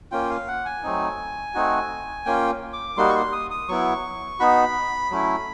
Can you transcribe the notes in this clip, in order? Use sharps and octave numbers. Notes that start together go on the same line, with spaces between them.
A#3 C#4 F4 G5
F5
F#5
G#5
F#3 A3 C4 D#4
A3 C4 D#4 F#4
A#3 C#4 F4 G5
D6
G3 A#3 D#4 F#4 C6
C#6
C6
D#6
D#6
F#3 B3 E4 C#6
B3 D#4 F#4 B5
F#3 A3 C#4 E4